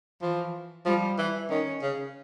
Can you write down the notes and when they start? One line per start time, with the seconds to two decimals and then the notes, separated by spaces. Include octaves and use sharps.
0.21 E3 F3
0.85 F3 G3
1.18 E3
1.49 D#3 C#4
1.82 C#3